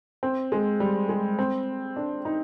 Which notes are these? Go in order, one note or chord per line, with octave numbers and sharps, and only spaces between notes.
C4
G#3
G3
G#3
C4
D4
D#4